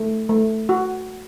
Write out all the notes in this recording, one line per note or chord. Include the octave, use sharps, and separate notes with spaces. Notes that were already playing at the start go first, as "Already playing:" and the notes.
Already playing: A3
A3
F#4